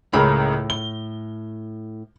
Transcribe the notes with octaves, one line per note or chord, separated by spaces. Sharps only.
C#2 A2 C#3 A#4 B5
G7